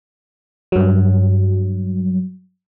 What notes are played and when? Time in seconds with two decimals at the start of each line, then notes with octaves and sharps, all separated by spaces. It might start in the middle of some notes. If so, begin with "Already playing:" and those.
0.72 G2 F#3